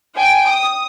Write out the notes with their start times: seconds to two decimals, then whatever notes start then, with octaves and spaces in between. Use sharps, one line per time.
0.15 G5 G#5 D7
0.48 D#6